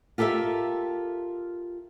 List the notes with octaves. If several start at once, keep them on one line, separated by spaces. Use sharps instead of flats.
F4 G4 A4 A#4 E5